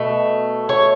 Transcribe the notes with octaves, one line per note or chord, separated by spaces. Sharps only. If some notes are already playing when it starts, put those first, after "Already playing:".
Already playing: B2 A3
C#5